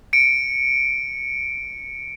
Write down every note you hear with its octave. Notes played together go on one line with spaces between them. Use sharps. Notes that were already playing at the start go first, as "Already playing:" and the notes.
C#7 D7